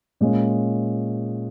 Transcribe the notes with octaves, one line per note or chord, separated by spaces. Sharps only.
A#2 G#3 C#4